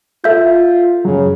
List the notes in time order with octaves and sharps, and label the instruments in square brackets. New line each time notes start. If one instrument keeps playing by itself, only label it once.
[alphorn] F4 [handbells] A4 E5 G6
[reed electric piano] F#2 F#3 [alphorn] C#3